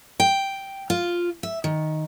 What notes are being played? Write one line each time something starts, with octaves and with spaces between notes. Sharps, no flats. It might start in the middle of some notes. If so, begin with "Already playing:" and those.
G5
F4
E5
D#3